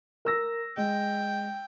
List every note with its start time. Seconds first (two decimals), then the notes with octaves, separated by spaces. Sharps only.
0.25 A#4 E6 A#6
0.77 G#3 G5